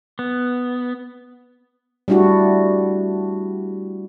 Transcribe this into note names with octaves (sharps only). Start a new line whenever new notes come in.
B3
G3 A3 D4 E4 F#4 G4